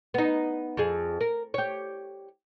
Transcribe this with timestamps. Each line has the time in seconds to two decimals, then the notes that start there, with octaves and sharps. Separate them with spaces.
0.14 B3 D#4
0.77 F2 G#4
1.21 A#4
1.54 G4 C#5